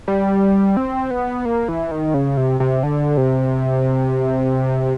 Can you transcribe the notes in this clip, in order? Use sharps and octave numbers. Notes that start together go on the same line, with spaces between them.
G3
C4
B3
A#3
E3
D#3
C#3
C3
C3
D3
C3